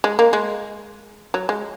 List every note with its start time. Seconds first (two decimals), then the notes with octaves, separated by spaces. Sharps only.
0.04 G#3
0.19 A#3
0.33 G#3
1.34 F#3
1.49 G#3